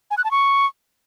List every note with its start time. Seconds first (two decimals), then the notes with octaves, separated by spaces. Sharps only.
0.11 G#5
0.17 F#6
0.24 A5
0.31 C#6